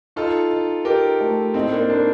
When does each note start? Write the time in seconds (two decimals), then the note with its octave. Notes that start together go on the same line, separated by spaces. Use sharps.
0.16 D#4 F4 A4
0.50 D#4
0.85 D#4 G4 A#4
1.21 A3
1.54 A2 C4 D#4
1.72 A#3 D4
1.89 A#3 D4 D#4